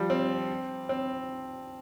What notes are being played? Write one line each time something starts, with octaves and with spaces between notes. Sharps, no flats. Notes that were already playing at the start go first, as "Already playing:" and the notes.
Already playing: F3 G3
C4
C4